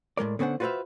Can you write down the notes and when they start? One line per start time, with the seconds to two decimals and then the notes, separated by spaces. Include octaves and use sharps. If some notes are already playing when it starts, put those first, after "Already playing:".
0.17 A2 G#3 A#4 D5
0.39 D3 B3 C#4 C5 F#5
0.60 F4 F#4 B4 C5 E5 F5